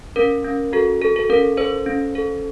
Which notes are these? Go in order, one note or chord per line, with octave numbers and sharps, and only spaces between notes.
C#4 A#4
C#4
F#4 A4
A4
A4
C#4 A#4
A4 C5
C#4
A4